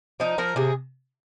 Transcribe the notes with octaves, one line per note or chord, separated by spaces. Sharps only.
F3 D#4
F3 A#4
C3 G#4